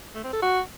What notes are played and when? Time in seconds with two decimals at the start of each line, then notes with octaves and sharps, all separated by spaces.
0.15 A3
0.24 C4
0.33 A4
0.42 F#4